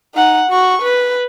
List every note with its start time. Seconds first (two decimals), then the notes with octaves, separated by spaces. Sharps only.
0.15 D#4 F#5
0.50 F#4 C#6
0.82 B4